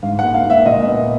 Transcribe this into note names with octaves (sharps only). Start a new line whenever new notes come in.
G#2 F5
F#5
A#3
F5
A#3
E5
A#2 D#5
B3